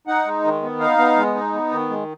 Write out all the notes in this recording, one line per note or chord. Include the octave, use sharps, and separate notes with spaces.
D#4 F#5
G#3
D#3
B3
D#4 F5
B3
G#3
D#4
B3
D#3
G#3